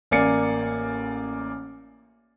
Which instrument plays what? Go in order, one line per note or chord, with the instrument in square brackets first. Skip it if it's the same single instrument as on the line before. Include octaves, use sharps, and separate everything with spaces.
[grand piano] A1 A#3 D5 G#5 C#7